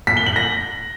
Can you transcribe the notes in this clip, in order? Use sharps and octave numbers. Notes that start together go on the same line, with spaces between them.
B6
G7
F#7
A#6